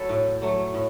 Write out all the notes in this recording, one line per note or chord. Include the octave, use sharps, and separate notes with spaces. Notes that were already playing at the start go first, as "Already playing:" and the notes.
Already playing: F#3 A3 A4 B4 C#5
A2
F#3 A3
A2